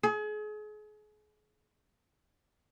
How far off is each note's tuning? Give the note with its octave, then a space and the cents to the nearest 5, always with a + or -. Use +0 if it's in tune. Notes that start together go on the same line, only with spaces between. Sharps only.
G#4 +35